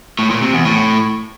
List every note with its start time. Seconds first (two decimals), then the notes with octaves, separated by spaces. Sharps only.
0.19 A2
0.30 A#2
0.42 C3
0.54 E2
0.65 A2